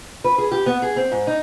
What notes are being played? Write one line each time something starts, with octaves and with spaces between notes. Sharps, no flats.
B4
G#4
G4
B3
G#4
C4
G#2
D#4